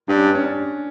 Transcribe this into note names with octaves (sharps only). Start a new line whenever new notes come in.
G2 D4
C#4
D4
C#4
D4